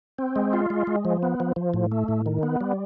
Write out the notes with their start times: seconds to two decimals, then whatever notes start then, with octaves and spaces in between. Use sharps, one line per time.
0.18 C4
0.36 G#3
0.53 F4
0.70 G#3
0.87 G#3
1.05 F3
1.23 B3
1.40 F3
1.56 F3
1.74 A2
1.92 A3
2.08 A2
2.26 D#3
2.43 B3
2.61 G3